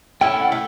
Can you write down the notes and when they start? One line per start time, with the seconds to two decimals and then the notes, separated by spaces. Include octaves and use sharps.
0.21 A3 C#4 E4 G5
0.32 G5
0.41 F#5
0.52 A3